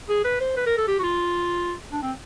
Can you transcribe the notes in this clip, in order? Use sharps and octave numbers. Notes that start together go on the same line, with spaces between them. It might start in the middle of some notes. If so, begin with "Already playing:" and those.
G#4
B4
C5
B4
A#4
A4
G4
F#4
F4
D4
C4